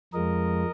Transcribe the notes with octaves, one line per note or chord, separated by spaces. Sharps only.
F2 F3 G#3 A#4 D#5